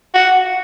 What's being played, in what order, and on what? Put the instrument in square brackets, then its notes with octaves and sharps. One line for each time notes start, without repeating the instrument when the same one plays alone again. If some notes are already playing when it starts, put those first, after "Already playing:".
[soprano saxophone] F#4